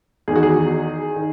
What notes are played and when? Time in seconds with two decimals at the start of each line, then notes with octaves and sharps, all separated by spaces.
0.28 E2 D#3 G#4
0.36 F#4
0.43 G#4
1.16 D#3